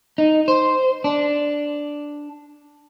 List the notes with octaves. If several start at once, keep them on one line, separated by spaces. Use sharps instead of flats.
D#4
C5
D4